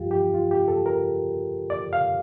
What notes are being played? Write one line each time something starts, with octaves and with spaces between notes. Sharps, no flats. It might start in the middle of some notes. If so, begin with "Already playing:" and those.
Already playing: G2 F3 F4 G4
G4
F4
G4
A4
A#4
D5
F5